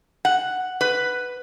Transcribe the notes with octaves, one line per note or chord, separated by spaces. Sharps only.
F#5
B4